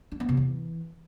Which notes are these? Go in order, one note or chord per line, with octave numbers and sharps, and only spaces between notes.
D4
B3
C3
E3